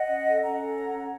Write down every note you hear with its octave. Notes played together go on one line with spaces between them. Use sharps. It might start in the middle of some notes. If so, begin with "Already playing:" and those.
Already playing: D#5 F#5
C#4
A4
C#4 F#5 A#5
A4
C#5
C#4